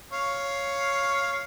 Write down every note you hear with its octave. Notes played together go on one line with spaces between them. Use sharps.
C#5 F5